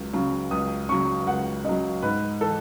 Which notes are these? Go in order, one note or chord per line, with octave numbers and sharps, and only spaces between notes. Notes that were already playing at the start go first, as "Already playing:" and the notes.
Already playing: C#2 F#3
C#3 F#3
C#2 D#6
C#3 F#3 C#6
C#2 F#5
C#3 F#3 D#5
G#2 B4
E3 A4